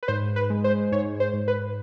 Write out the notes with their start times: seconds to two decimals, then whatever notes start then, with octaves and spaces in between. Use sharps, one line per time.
0.03 B4
0.08 G#2 C5
0.36 B4
0.50 G#3
0.64 C5
0.92 G#2 C#5
1.20 C5
1.34 G#2
1.48 B4